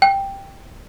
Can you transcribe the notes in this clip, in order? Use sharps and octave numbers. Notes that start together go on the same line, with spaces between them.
G5